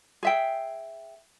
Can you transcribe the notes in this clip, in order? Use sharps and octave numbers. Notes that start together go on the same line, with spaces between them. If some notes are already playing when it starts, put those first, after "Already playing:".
G#4 E5 G5